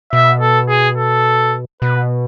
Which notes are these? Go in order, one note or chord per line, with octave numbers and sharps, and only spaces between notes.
B2 E5
A4
G#4
A4
B2 B4